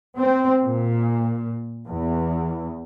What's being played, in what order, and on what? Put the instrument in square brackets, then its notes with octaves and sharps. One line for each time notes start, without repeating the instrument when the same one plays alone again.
[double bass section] C4
A#2
E2